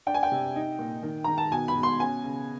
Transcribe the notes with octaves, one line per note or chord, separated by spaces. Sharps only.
D4 G5
G#5
G5
C3
D#4
A#2
D#3
D#3 A#5
A5
B2 G#5
B5
B2
C6
C#4 G#5
C#3